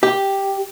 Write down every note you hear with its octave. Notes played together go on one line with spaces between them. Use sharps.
G4